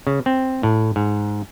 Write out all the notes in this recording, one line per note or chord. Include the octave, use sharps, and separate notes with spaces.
C#3
C4
A2
G#2